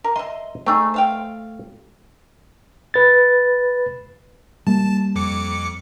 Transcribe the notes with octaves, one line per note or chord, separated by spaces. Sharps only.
A#4
D#5 E5 C6
A3 C4 D#4 G#4
C5 F5 G5
B4 A6
G3 A#3 A5
F2 D6 C#7